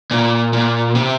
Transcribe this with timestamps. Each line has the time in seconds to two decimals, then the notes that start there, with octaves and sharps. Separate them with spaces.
0.11 A#2
0.53 A#2
0.95 C3